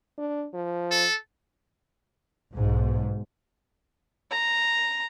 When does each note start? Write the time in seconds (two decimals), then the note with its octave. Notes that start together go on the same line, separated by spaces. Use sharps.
0.18 D4
0.54 F3
0.91 A4
2.55 B1 G#2
4.31 A#5